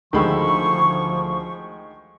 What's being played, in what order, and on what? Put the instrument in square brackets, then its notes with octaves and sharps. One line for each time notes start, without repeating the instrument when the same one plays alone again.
[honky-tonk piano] D2 B5 E6 [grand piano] D#3 G#3 G4 [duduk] F3 [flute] C#6